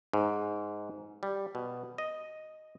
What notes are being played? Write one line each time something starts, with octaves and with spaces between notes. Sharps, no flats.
G#2
G3
B2
D#5